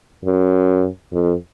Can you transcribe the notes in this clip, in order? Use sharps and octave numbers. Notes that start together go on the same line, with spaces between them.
F#2
F2